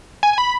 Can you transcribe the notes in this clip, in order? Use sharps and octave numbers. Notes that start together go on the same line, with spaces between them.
G#5
G#5
B5